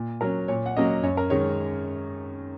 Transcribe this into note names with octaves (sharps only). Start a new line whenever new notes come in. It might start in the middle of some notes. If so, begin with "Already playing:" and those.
Already playing: A#2
F#3 C#4 A#4
A#2 C#5
F#5
F#3 A#3 C#4 D#5
F#2 C#5
A#4
D#3 G#3 C#4 C#5